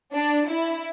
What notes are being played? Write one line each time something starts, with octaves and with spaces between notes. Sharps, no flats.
D4
E4